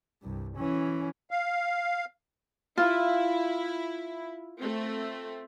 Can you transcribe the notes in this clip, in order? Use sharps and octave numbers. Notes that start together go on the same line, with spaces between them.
C2 G2
E3 C#4
F5
E4 F4
A3 C4